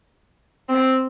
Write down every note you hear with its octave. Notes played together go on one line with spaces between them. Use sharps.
C4